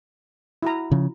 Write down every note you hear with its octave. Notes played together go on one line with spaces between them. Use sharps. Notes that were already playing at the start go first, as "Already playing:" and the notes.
E4 F#4 A#5
C#3 F3